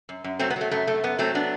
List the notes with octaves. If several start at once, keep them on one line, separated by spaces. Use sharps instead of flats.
F#2
F#2
F#3 A3 C4
B3
F#3 A3
F#2 A3
F#2 A3
F#2 B3
F#3 A3 C4
B3 D4